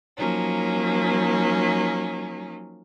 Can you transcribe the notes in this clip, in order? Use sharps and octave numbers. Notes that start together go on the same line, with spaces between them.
F3 F#3 A#3 C#4 D#4